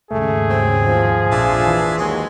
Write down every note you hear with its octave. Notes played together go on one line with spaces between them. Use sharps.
D#2 G#2 C#3 A3 G#4
F#3 C4
F3
A#1 F2 D4 F4 E5
E3
D#2 F#3 G#3